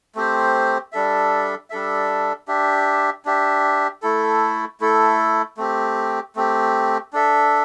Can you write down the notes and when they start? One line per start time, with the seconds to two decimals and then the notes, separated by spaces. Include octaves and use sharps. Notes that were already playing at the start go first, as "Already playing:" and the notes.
0.15 A3 C4 G4 C5
0.92 G3 D4 A4 E5
1.70 G3 D4 A4 E5
2.48 D4 G4 E5
3.25 D4 G4 E5
4.02 A3 E4 A4
4.81 A3 E4 A4
5.57 A3 C4 G4
6.36 A3 C4 G4
7.13 D4 A4 E5